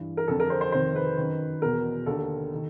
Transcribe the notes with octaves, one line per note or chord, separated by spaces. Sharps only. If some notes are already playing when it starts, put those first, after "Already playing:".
Already playing: G2 E3
A#4
F2 D3 A4
A#4
C5
C5
F2 C3 D#3 C5
B4
F#2 D#3
E2 B2 A#4
D#2 D3 A4
D#3